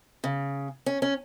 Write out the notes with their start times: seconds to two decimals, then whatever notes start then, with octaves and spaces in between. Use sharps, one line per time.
0.24 C#3
0.86 C#4
1.02 C#4